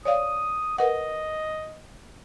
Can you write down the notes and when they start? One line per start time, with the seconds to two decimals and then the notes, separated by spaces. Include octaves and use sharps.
0.05 C#5 D5 F5 D#6
0.78 A#4 B4 D#5 F#5